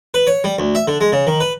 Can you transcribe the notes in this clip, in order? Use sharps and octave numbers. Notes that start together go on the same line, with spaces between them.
B4
C#5
G3
D2
E5
D3
G#3
C#3
D#3
B4